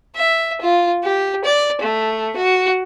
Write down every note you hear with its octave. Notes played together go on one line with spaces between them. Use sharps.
E5
F4
G4
D5
A3
F#4